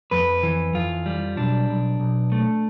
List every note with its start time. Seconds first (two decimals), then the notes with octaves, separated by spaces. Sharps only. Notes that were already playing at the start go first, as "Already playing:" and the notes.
0.11 F2 B4
0.43 E3
0.74 F2 F4
1.06 G3
1.37 B1 D4
1.69 B1
2.00 B1
2.32 A3